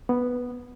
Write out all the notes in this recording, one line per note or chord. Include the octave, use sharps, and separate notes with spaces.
B3